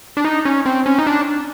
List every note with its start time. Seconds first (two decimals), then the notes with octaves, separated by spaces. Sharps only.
0.17 D4
0.25 D#4
0.45 C#4
0.66 C4
0.86 C#4
0.99 D#4
1.07 D4